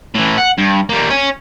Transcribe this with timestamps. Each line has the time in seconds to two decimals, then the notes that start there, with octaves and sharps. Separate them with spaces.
0.15 A2 E3
0.38 F#5
0.58 G2
0.89 G3 A#3
1.10 C#5 G#5